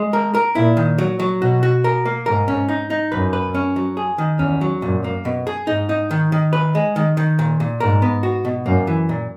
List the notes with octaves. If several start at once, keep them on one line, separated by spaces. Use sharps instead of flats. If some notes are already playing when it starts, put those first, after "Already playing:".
Already playing: G#3
A#4
A#4
A#2 E4
D#3
F#3
F#3
B2 F#4
F#4
A#4
A#3
G#2 A#4
C#4
D#4
D#4
F#2 B4
B4
C#4
F#3
G#4
D#3
E2 C#4
F#3
F#2 A#2
A#3
B2
G#4
G#2 D#4
D#4
D#3
D#3
B4
G#3
D#3
D#3
A#2
A#2
G#2 A#4
B3
F#4
B2
F#2 A#3
E3
A#2